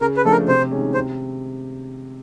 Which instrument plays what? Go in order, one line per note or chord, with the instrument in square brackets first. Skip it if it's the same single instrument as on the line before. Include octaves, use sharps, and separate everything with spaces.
[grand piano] C#3 [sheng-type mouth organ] A#4
[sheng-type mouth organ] B4
[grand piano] F3 A3 D4 [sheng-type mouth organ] A4
[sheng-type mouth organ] A#4
[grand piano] C3 [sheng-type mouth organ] C5
[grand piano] D#3 G#3 C#4
[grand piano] C3 [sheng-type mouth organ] C5